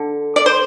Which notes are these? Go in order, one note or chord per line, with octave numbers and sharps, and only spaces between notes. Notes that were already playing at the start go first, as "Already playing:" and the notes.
Already playing: D3
D5
C5